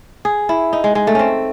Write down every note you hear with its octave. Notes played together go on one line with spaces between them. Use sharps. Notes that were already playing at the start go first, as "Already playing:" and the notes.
G#4
E4
D#4
G#3
G#3
A3
C4 C#4